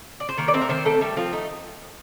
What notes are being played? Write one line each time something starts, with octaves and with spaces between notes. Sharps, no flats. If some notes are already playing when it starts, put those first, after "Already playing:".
D5
C5
D#3 A#3 A#4
D5
A3 C4 C5
A#4
D#3 C4 C5
A3 C4 A4
G3 A3 G4
F3 C4 F4
A3 D#4